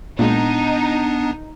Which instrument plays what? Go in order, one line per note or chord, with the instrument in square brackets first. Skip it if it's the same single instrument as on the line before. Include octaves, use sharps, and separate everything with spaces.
[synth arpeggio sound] A#2 G#3 [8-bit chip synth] B3 D4 [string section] D#4